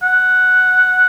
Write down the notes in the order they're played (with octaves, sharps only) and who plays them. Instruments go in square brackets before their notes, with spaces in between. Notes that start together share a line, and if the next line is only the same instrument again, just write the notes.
[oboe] F#5